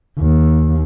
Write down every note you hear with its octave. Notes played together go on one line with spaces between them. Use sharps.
D#2